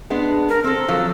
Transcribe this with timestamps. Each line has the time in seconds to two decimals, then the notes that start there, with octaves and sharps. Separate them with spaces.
0.10 G#3 B3 D4
0.49 A#4
0.64 C4 A4 E6
0.88 F3 F#3